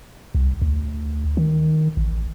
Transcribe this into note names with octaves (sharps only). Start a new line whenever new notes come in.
C2
D2
D#3
A1